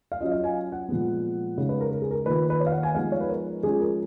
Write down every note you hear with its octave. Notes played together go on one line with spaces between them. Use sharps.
F5
F#3 C#4 F4 D#5
F5
G#5
F#5
A#2 F3 G#3 B3
C#3 G#3 D#4
B4
A#4
A#4
G#4
A#4
D#3 A#3 F4 B4
B4
C#5
F5
F#5
G#5
F3 G#3 B3 D#4 F5
C#5
B4
A#4
F3 G#3 C#4 F4 G#4
A#4